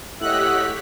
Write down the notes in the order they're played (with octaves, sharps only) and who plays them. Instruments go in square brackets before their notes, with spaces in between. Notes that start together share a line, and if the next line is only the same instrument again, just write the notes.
[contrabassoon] A2 [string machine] G4 C#5 B6 [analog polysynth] D#5 F#5 F#6 [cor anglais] E5